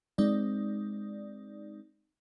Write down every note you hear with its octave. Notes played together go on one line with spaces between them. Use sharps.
G#3 C4 D#4 D5